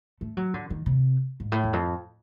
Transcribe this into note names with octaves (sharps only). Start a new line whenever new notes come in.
A3
F#3
D3
D#3
C3
G#2
A2
E2
F2